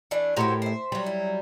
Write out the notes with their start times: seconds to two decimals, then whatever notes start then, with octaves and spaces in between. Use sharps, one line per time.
0.11 E3 A3 D4
0.37 A2 E4 F#4 G4 A#4 C5
0.62 C5 E5
0.92 F#3 G3
1.06 E4